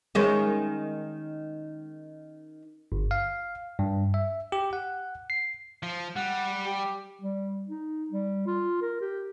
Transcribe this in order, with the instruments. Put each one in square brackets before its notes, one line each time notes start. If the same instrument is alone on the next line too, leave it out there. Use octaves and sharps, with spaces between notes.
[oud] D#3 G#3 C#4
[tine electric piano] G1
F5
G2
E5
G4
F#5
C7
[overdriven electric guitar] F3
[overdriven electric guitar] G3 [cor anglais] F#5
[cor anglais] G4
[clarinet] G3
D#4
G3
F4
A#4
G4